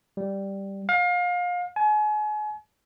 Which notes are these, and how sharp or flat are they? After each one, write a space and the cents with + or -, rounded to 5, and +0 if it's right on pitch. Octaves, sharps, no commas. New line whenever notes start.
G3 +0
F5 +30
G#5 +35